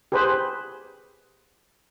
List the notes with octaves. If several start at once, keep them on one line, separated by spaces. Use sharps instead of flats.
G4 G#4 B4 C5